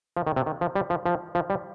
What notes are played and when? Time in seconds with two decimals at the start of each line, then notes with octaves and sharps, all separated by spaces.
0.17 F3
0.27 D#3
0.36 C3
0.46 D#3
0.61 F3
0.75 G3
0.90 F3
1.06 F3
1.35 F3
1.50 G3